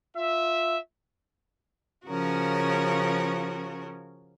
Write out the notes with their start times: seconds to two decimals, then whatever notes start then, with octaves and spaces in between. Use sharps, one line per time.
0.16 F4 E5
2.09 C#3 F3 C#4 F#4 A#4